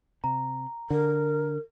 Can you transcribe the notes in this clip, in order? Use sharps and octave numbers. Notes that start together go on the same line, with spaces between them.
C3 A#5
D3 A#4